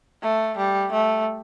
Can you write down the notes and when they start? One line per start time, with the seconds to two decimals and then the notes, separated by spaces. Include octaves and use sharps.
0.22 A3
0.57 G3
0.92 A3